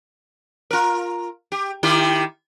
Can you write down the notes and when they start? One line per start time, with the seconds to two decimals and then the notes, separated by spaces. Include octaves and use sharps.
0.71 F4 A#4
1.52 G4
1.83 D#3 E4 G4